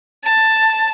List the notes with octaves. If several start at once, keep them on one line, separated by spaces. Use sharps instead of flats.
A5